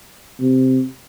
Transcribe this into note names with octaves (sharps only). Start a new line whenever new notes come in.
C3